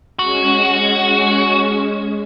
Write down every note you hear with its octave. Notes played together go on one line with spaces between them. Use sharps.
G#3 C#4 F#4